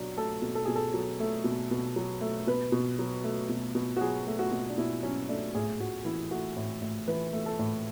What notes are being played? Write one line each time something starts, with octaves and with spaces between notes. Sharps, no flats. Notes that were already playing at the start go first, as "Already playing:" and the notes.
Already playing: B2 F#3 D4
A3 A4
B2
A4
B2 G#4
A4
F#3
A3
B2
B2
F#3
A3
B2 B4
B2
F#3
A3
B2
B2
F#4
F#3 G#4
A3
F#4
B2
D4
B2 E4
F#3 C#4
A3 D4
A2 G#4
A2 F#4
E3 E4
A3 F#4
A2
A2
E3 B4
A3
A4
A2